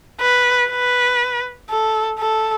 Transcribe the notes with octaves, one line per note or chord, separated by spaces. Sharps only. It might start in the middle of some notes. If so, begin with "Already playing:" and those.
B4
B4
A4
A4